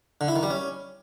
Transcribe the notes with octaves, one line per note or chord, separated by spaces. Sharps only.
D3
E4
D#3
G3
C#4